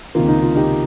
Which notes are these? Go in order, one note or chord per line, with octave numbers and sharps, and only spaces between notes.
C#2 C3 D#3 A#3 F4
D#4
F4
D#4 G4